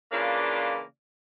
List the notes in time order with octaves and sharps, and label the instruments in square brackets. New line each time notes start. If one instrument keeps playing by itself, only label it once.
[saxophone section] C#3 E3 A#3 D4 F4 D5